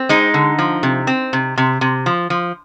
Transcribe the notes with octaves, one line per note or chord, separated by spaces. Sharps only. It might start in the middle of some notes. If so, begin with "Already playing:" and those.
Already playing: C4
G#3 D#4
D3
F3
C3
C4
C3
C3
C3
F3
F3